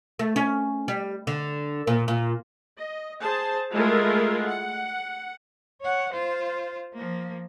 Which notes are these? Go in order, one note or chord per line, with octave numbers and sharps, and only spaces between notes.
A3
C#4
G3
D3
A#2
A#2
D#5
G#4 C5 A5
G#3 A3 E4 F4 A#4
F#5
C#5 F#5
F4 C5
F3 A#3